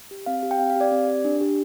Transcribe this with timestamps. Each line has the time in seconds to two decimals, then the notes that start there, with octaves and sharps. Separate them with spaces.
0.11 G4
0.26 C4 F5
0.43 G4
0.51 G5
0.59 C4 F5
0.70 F5
0.76 G4 D5
0.91 C4
1.08 G4
1.25 D4
1.41 G4